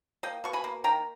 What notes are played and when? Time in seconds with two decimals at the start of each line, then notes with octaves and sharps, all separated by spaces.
0.23 A#3 D#5 G5
0.44 B2 C#6
0.53 G#5 B5
0.64 A#3
0.84 D#3 G5 A#5